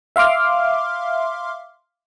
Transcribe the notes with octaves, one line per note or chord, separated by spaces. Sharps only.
E5 F5 C6 D6 F6